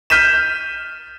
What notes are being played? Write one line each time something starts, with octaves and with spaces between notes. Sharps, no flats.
F6 G6 B6 D#7 E7